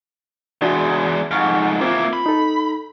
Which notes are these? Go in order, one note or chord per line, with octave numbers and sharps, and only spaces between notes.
E2 G#3 D4 F#4 D5
F2 G#2 F#5 C#6 F6
A#3 C4 E4 F4
B5
D#4 A4